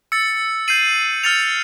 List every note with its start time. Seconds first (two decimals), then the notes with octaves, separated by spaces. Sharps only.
0.12 E6 A6 C#7
0.68 G6 C7 D#7 F#7
1.23 F6 A6 C#7 F7